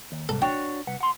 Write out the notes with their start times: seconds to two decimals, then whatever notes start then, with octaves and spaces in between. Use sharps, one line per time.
0.12 D#2
0.29 C2 G#2 A4
0.42 D4 F#4 C#5 G5
0.87 C2 B4 F#5
1.01 F#5 C6